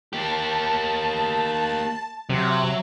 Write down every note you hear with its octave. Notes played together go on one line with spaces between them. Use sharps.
A#3 G4 A5
C3 F#3 E5